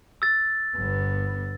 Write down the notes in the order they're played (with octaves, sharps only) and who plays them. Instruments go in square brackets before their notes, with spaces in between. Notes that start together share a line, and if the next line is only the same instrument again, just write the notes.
[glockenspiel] E6 A6
[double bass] G1 B3